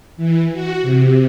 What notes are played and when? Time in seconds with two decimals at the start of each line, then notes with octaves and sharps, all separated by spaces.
0.17 E3
0.53 F#4
0.82 C3